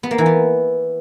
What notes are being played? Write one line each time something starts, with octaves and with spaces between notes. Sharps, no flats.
B3
A#3
E3
B3